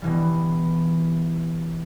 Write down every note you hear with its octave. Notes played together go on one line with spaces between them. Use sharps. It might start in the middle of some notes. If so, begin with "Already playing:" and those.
B2 E3 G3